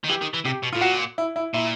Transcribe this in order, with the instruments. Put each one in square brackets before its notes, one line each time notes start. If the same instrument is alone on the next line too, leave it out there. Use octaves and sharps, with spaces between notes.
[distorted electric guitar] D#3
[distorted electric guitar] E3 [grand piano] G4
[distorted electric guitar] D#3
E3
[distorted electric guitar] C3 [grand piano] G4
[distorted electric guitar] B2
[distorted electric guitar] A2 [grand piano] F4
[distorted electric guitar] A#2 [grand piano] F#4
[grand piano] E4
E4
[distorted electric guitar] A#2 [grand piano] E4